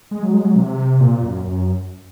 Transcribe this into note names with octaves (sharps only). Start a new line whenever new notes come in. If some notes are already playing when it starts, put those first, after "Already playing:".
G#3
F#3
G#3
F#3
C3
A#2
F#2
F#2